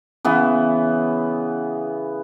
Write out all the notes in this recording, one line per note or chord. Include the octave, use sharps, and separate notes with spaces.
C#3 E3 B3